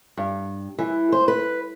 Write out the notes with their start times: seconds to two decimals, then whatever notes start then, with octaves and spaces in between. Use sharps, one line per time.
0.17 G2
0.79 E3
1.12 C5
1.28 B4